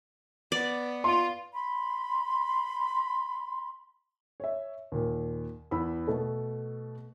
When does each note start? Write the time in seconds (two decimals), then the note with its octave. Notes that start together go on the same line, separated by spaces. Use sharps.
0.52 B3 D5
1.04 F4 C6
1.52 B5 C6
4.40 C#5 E5
4.92 D#2 A#2
5.71 E2 B5 E6
6.07 B2 A3 A4